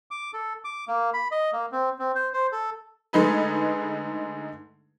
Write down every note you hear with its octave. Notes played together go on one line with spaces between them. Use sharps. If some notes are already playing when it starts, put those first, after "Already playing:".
D6
A4
D6
A#3
B5
D#5
A#3
C4
C4
C5
C5
A4
D3 G#3 A3 D#4 G#4 B4